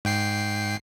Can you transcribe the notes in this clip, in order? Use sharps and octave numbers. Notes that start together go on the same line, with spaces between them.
G#2 G5 C7